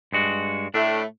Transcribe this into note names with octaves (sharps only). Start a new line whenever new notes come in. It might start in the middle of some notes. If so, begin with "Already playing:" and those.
G2 G#3 F#4
A2 A3 D4